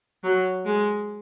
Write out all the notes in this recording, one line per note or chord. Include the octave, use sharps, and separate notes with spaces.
F#3
G#3